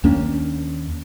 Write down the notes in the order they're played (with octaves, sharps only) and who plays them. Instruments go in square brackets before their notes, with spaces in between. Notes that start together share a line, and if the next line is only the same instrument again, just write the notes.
[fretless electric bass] D#2 A#3 C#4 D4